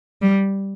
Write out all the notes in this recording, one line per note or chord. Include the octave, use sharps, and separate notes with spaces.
G3